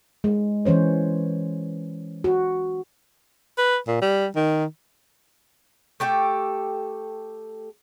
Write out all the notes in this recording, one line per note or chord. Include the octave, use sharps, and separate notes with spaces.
G#3
E3 C#4 C5 C#5
F#4
B4
A#2
G3
D#3
A3 G4 A4 G5